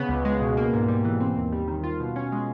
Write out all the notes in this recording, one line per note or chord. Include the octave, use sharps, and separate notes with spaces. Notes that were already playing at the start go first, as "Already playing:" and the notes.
Already playing: C#3 B3
C#2
G#3
B2
A#3
G#2
G3
E3
C4
D#2
G3
D#3
F4
B2
C#4
G#3